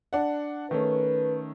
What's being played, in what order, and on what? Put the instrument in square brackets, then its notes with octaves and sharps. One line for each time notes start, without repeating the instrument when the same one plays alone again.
[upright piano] D4 F#5
[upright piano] D#3 A3 C#4 [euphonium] B4